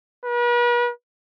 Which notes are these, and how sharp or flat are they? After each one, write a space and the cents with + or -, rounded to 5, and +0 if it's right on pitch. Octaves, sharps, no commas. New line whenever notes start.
B4 -45